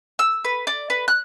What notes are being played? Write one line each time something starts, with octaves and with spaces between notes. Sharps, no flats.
E6
B4
D5
B4
F#6